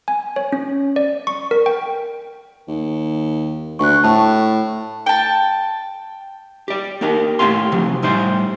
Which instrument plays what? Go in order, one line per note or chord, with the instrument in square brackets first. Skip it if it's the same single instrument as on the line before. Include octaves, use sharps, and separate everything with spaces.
[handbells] G#5
C#5
C#4
D5
C#6
A#4
G5
[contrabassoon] D#2
[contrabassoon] D2 [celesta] C#6 F#6
[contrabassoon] A2 [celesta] A5
[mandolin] G5 A5
[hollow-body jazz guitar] G4 D5
A#3 G4 A#4
A2 C#4 E4 G4 F5 C6
C3 F3 F#3
A2 G3 E4 C5